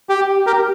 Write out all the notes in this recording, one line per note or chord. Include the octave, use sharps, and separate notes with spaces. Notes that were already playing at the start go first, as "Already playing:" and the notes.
G4
G4 A#4